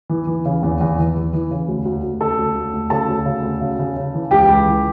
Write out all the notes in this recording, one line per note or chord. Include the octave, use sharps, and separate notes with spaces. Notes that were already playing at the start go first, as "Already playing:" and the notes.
E3
E3
C#3
E2
E2
E3
E2
E3
C#3
D2
D2
D2
C#3 A4 A5
D2
D2
D2
C#3 A4 A5
D2
C#3
D2
C#3
C#3
C#3
E3
C#2 G4 G5
C#2
E3